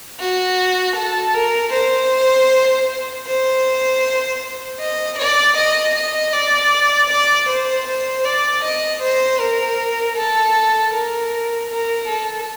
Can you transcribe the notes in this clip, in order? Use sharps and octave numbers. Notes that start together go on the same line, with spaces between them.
F#4
A4
A#4
C5
C5
D#5
D5
D#5
D#5
D5
D5
C5
C5
D5
D#5
C5
A#4
A4
A#4
A#4
A4